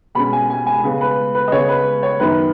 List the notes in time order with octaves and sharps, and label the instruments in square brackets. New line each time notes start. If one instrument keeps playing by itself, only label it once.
[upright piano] B2 G#3 C#4 B5
G#5
G#5
G#5
C#3 G#3 B3
B4
B4
D#5
C#3 B3 C#5
B4
C#5
F#2 D#3 B3 B4